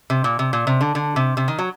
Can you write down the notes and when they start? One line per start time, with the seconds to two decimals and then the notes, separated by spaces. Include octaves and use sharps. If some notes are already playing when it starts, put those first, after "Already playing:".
0.10 C3
0.24 A#2
0.39 C3
0.53 A#2
0.67 C3
0.81 D3
0.95 D3
1.16 C3
1.37 C3
1.48 D#3
1.59 F#3